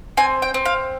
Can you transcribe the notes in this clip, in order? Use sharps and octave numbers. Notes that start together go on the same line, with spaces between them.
C4 G#5
G5
C4
F5